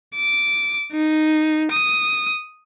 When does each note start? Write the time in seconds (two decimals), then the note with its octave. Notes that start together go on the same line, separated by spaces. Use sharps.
0.16 D6
0.93 D#4
1.72 D#6